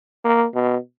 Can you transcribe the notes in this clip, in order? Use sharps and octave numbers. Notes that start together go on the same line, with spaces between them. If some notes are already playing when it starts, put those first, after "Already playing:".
A#3
B2